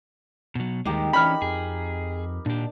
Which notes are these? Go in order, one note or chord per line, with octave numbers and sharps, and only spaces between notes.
B2 F#3
D#2 D#3 G3 G#3 D#4 G4 A#4
E3 C#4 D4 B5 F6
F2 G#4
A#2 D4 G4